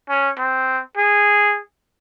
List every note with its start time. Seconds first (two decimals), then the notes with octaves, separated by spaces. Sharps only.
0.09 C#4
0.39 C4
0.98 G#4